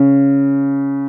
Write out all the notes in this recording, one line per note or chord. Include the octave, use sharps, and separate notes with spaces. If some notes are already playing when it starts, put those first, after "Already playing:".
Already playing: C#3